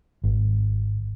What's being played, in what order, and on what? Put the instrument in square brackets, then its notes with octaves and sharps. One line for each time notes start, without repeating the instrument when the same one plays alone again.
[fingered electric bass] G#1